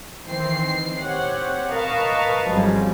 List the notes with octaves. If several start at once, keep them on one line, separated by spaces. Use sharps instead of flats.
D#3 E3 C4 C7
C4 G4 C#5 F#5
A#4 B4 D#5 F5 A5 C#6
G#1 F2 C#3 F#3 G3